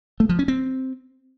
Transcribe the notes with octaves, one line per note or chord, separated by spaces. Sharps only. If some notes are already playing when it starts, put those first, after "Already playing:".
A3
F3
C#4
C4